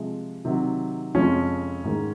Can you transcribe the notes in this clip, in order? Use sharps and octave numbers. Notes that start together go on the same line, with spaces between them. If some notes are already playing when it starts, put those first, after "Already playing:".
Already playing: C3 F3 G#3
C3 D#3 F#3
F2 C3 F3 G#3 C#4
G#2 D#3 G#3